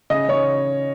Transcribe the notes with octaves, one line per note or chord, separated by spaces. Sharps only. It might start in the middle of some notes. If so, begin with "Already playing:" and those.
C#3 D#5
C#3 C#5